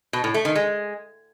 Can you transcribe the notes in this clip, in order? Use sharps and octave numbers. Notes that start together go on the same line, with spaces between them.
B2
A2
A3
D#3
G#3